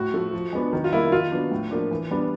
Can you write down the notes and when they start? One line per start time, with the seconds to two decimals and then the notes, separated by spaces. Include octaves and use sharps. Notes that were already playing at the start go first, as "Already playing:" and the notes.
Already playing: A2 F#4
0.14 F3 A3
0.33 F3
0.53 G#3 B3 D4
0.73 D#3
0.84 F4
0.92 G3 A#3 E4
1.12 D#3 F4
1.32 F#3 B3 D4
1.52 A2
1.71 F3 A#3 D4
1.91 E3
2.11 G3 B3 D4